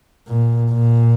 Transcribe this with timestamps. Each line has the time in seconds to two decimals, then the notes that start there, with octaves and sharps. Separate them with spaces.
0.28 A#2
0.71 A#2